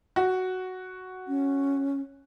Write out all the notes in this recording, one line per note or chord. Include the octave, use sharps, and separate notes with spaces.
F#4
C#4